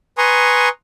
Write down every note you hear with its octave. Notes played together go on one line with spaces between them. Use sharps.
B4 G#5 A#5 C6 C#6 D#6